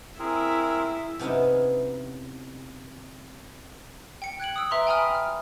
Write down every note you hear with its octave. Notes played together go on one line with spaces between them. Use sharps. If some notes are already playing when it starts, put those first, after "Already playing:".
C4 E4 G#4 A#4
C3 B3 C#4 D#4 E4
G5 C#7
F#6 G#6 D7 F#7
D#6 E6
B4 E5 A#5 C6
G5 G#5 A#5 B5 D#6 F6
F6